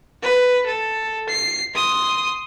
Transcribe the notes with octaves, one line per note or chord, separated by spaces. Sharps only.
B4
A4
C7
C6 D#6